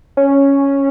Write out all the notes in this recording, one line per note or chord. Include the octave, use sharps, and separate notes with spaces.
C#4